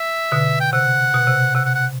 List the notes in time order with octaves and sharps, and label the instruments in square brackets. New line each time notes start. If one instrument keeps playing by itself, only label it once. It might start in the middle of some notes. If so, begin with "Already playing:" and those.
Already playing: [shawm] E5
[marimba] B2 D3
[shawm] G5
[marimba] C3 [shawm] F#5
[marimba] B2
C3
[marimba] C3 [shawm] F#5
[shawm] F#5
F#5